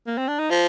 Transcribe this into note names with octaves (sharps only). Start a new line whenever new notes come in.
A#3
C4
D4
D#4
F3 F4